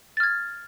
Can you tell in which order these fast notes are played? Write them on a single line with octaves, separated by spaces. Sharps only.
A6 F6 G#6